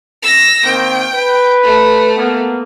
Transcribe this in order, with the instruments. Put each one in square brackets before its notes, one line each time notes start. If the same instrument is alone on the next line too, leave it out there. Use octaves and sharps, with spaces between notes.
[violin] E6 A#6
[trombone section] D#3 A#3 C4 [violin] G5
[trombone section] B4
[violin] A3
[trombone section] A#3 B3